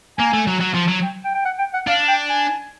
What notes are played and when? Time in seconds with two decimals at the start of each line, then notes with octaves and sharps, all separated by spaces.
0.18 A#3 G#5
0.33 A3
0.47 F#3
0.61 F#3
0.75 F3
0.88 F#3
1.02 G5
1.25 G5
1.35 G5
1.45 F#5
1.59 G5
1.74 F#5
1.87 D4 F5
2.08 G5
2.30 G#5